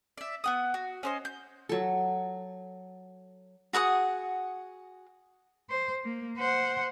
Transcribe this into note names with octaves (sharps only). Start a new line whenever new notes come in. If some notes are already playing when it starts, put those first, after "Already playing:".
D5 E5
B3 F#5 D#6
F#4
C#4 C5 D#5
G6
F#3 A4
F#4 G#4 F#5 D#6
C5
A#3
C5 F#5